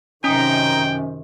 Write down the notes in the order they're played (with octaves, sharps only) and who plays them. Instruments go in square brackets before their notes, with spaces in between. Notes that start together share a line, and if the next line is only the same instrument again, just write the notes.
[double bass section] F#2 C3 D#3 [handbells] C#4 [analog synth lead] D#4 [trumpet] G5